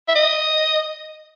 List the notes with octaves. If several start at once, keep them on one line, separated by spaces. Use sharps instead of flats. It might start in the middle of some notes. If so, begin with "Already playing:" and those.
E5
D#5